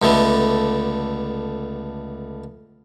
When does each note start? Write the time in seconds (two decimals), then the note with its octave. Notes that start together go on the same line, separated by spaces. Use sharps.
0.02 C#2 D3 A3 B3